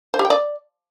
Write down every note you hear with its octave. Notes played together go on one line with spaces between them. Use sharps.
C5
G4
G5
D5